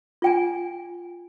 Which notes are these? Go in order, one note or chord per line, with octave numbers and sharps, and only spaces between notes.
F4 G5 G#5